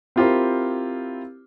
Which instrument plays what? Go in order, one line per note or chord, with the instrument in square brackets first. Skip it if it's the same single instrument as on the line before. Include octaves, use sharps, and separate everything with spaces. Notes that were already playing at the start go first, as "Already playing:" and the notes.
[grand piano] C4 E4 F4 G4 A#4 C5